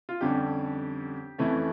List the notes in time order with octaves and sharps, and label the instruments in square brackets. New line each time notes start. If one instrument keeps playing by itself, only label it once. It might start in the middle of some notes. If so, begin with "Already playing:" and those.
[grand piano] F4
F2 D3 G3 C#4 G4
F2 E3 A3 C#4